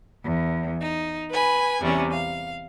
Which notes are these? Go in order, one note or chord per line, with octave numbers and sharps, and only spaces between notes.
E2
D#4
B4 G#5 B5
E2 C3 G3 C#4
F5